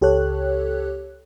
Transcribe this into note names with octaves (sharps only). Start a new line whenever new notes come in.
C#2 G4 A4 C#5 F#6